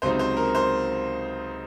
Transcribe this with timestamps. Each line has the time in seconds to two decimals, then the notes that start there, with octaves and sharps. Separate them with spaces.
0.02 C#2 C3 F#3 C4 D#4 C5
0.19 C5
0.37 A#4
0.55 C5